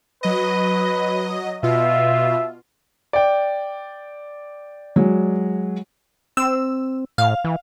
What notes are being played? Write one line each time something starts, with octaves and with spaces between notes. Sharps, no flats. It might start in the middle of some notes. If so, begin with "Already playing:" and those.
F#3 B4 D#5
B2 F4 E5
D5 G5
F#3 G#3
C4 E6
A2 F5
E3